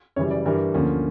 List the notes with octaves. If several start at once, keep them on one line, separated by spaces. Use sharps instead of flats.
F#2 C#3 E3 G3 C#5
D5
G2 E3 G3 A#4
D2 D3 F3 A#3 C#4